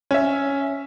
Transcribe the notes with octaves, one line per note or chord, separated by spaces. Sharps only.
C#4 E5